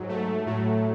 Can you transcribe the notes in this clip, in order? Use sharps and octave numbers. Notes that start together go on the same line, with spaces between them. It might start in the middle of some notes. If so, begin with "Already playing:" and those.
Already playing: G#2 F#3
A3
A2 F#3 A3